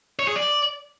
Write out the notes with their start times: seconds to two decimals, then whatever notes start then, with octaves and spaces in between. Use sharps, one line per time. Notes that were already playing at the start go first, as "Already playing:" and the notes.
0.19 C#5
0.28 G#4
0.36 D5